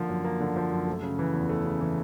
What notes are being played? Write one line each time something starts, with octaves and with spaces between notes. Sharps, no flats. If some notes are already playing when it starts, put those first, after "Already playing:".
Already playing: D3 F3 A#3
F#2
A#3
D3
F3
F#2
A3
C#3
E3
E2
A3
C#3
E3